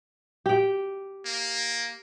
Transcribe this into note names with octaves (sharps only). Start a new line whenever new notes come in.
G4 G5
A#3